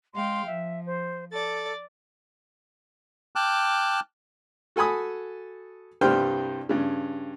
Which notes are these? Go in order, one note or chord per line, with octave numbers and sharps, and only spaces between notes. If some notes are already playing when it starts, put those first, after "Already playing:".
G#3 F5 G5 C6
F3 E5
C5
A4 D5 A6
G5 A5 D6 F6 F#6
F#4 A4 G#5 B5 D#6
C2 G2 G3 C5 G5 F6
G2 C#3